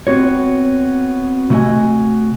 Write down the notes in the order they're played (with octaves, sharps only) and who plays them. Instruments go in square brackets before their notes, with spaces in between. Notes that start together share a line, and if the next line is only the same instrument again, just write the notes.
[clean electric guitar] B3 C4 F#4 C#5
C3 A3 F#4 G4 D#5 G#5